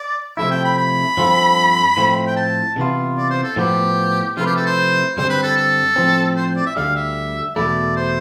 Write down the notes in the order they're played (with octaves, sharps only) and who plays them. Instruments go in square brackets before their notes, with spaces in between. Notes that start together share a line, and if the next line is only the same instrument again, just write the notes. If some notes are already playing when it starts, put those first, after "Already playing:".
Already playing: [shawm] D5
[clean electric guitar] C3 F3 A3 E4 [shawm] E5
[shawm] G5
B5
B5
[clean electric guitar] G2 F3 C4 F4 A4
A2 F3 A3 C4
[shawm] G5
A5
[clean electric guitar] C3 E3 B3 F4
[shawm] D5
C5
A4
[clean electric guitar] A2 F3 B3 [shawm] G4
[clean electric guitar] C3 F3 A3 E4 B4 [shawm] F4
[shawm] G4
A4
C5
[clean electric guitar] G2 D3 G3 C4 [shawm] C5
[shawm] B4
A4
A4
[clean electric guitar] A2 F3 C4
[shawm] C5
D5
E5
[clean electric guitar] D2 D3 G3 [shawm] F5
[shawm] E5
[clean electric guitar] E2 B2 A3 E4 [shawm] D5
[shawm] C5